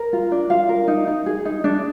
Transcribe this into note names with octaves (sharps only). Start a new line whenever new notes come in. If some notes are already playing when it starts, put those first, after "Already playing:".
Already playing: A#4
F4
D4
F4 F5
A#4
D#4
D#4
G#4
D#4
D4